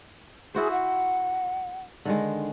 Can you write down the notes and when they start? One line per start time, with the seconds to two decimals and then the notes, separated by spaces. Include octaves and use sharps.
0.55 E4 F#4 G#4 C5
0.72 F#5
2.05 D3 D#3 G#3